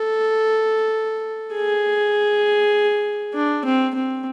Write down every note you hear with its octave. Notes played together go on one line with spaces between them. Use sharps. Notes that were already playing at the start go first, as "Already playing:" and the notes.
Already playing: A4
G#4
D4
C4
C4